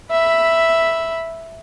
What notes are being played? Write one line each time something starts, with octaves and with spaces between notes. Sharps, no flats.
E5 B5